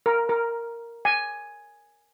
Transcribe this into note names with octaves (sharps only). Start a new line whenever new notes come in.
A#4
A#4
G#5